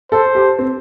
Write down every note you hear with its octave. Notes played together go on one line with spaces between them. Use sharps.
A4 C5
G4
C4